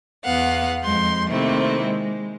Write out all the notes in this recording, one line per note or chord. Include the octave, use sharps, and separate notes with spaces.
E2 B3 F5 F#5
F2 G#3 C6 G6
C3 D#3 A3 A#3 C4 E4
G#3